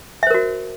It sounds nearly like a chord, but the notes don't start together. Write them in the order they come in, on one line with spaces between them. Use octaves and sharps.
E5 C5 A#4 F#4